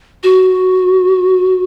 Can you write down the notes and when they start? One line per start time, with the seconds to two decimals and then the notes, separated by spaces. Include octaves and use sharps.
0.23 F#4